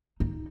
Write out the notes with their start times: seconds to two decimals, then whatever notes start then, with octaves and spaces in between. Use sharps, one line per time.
0.20 D#4